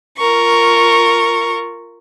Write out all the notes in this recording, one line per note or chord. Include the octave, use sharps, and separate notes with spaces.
F4 A#4 C#6